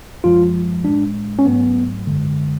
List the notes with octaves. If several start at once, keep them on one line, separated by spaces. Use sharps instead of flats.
F#2 F3 G#3 F4
A2 G#3 D4
C#4
G#2 F#3 A3 B3
F#2 D3 G#3